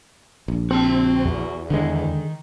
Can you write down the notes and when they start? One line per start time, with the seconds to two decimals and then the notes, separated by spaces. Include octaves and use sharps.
0.48 A#1
0.71 C4 F#4 A5
1.25 E2
1.70 D3 D#3 G#3